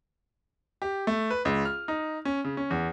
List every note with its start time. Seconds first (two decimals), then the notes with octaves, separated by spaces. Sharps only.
0.82 G4
1.07 A3
1.30 B4
1.45 C#2
1.65 F6
1.88 D#4
2.25 C#4
2.44 C#3
2.57 C#4
2.70 E2